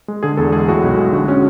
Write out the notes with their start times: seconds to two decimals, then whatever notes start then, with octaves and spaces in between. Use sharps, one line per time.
0.08 G#3
0.23 D3 G#4
0.37 E2 A4
0.52 G#3 G#4
0.68 A2 F#4
0.83 B1
0.98 G#3
1.12 D3 F#4
1.28 C#4